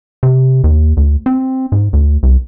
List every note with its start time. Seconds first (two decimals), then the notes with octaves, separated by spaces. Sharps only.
0.23 C3
0.64 D#2
0.97 D2
1.26 C4
1.72 G#2
1.93 D2
2.23 C2